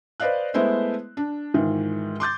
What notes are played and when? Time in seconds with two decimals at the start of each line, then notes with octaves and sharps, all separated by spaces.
0.20 B4 C5 D5 D#5 F5 F#6
0.54 G#3 A3 B3 E4 C5 E5
1.17 D4
1.54 G#2 D#3 E3 F4
2.20 C6 D6 G6 A6